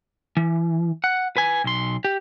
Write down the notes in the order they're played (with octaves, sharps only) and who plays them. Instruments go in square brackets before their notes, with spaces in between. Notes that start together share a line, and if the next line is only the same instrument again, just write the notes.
[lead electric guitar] E3
F#5
B4 G#5
B1 C6
G4